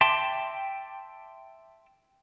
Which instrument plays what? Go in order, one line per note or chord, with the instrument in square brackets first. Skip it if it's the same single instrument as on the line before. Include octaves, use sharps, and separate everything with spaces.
[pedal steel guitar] E5 G5 A5 C6 D6